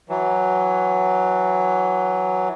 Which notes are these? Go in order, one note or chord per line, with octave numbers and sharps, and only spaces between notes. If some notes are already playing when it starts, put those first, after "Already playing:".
E3 F#3